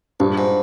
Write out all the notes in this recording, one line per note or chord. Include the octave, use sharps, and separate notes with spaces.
A#1 G2
G#2